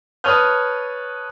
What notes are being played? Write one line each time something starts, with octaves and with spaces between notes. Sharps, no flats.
B4 C#5 A5 D#6 F6 G6